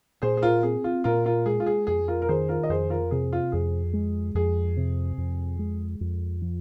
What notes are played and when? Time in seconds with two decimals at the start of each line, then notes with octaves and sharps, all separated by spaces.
0.22 A#2 G#4 C5
0.37 G#4
0.42 F4 A#4
0.63 C4 G#4
0.84 F4
1.04 A#2 F4 A#4
1.25 F4 A#4
1.46 G#3 G#4
1.60 F4
1.66 G#4
1.87 F2 G#4
2.08 F4 A#4
2.22 A#4
2.29 D#3 G#4 C5
2.49 F4 A#4
2.63 D#5
2.69 F2 G#4 C5
2.90 F4 A#4
3.11 C3 G#4
3.33 F4
3.52 F2 G#4
3.93 G#3
4.35 F2 G#4
4.77 C3
5.18 F2
5.59 G#3
6.01 F2
6.42 F3